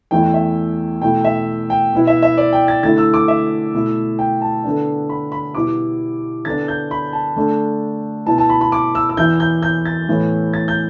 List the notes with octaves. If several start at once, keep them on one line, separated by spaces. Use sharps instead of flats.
E2 E3 A3 E4 G5
E5
B2 A3 E4 G5
E5
G5
B2 B3 E4
E5
E5
D5
G5
A6
D3 A3 E4 A6
E6
D6
E5
B2 A3 E4
G5
A5
D3 B3 D4
B5
B5
B2 G3 B3 E4 D6
D3 B3 D4 A6
G6
B5
A5
D3 A3 D4
B2 B3 E4 A5
A5
B5
B5
D6
E6
E6
E2 E3 B3 E4 G6
G6
G6
A6
A2 E3 B3 E4
A6
G6